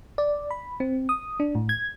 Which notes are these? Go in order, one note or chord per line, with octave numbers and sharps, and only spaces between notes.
D5
B5
C4
D#6
D4
A2
G#6